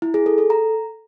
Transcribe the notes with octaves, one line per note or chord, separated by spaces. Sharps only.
E4
G#4
A4
A4
A#5